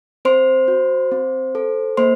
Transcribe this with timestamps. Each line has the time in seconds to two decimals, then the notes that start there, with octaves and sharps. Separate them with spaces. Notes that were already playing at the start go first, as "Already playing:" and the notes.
0.25 C4 C5 C6
0.68 F#4
1.12 C4
1.55 A4
1.97 A#3 C5 C6